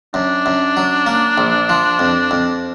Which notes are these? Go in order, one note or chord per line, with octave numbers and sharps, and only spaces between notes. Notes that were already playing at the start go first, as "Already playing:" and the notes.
F#2 D4
F#2
F#3
A#3
A#1
F3
F2
F2